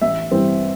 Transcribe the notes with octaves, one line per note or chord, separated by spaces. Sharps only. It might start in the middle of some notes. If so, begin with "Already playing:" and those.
A1 E5
G2 E3 G3 C4